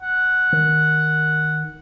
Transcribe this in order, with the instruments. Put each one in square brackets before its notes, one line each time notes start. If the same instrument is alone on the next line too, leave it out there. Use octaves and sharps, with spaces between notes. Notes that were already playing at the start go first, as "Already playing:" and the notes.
[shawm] F#5
[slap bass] D#3